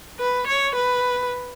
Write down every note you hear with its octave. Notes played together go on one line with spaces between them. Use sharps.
B4
C#5
B4